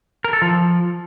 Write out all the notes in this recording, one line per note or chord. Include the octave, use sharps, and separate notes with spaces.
A#4
A4
F3